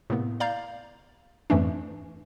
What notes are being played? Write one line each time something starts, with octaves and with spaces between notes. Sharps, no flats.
A2 C3 A#3 B3
D5 F5 A#5 G6
F2 G#2 E3 A3 C#4 D4